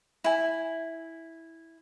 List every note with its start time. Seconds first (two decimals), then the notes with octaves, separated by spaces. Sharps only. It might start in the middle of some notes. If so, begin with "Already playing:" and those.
0.24 E4 G#5